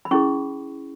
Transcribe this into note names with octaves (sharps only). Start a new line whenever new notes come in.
B5
C#4 E4 G#4 C#6